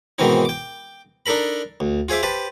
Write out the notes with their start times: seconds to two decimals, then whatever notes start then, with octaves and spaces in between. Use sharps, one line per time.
0.19 G#2 B2 D#3 E3 C4 D#4
0.45 G5 D6
1.26 D4 D#4 A4 A#4 B5
1.80 D2
2.09 F4 G#4 C5 E5 D6
2.23 G4 B4 C5 A5